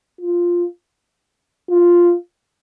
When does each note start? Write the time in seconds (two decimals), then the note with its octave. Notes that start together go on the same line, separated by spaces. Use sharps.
0.21 F4
1.70 F4